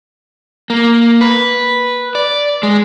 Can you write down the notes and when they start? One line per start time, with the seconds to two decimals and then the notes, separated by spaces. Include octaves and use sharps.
0.70 A#3
1.21 B4
2.15 D5
2.63 G#3